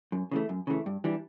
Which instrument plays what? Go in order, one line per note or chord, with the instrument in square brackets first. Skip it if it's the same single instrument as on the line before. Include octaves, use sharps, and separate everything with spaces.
[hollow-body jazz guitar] F#2
C#3 E3 A3
F#2
C#3 E3 A3
G2
E3 G3 D4